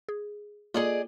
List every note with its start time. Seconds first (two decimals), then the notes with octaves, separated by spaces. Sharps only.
0.09 G#4
0.74 A#3 F4 G#4 D5 D#5